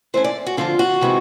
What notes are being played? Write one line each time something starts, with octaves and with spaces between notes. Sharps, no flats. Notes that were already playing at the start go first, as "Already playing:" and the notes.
E3 A3 C#4 C5
D5
F#4
D3 F3 A#3 F4
F#4
C3 E3 G#3 B3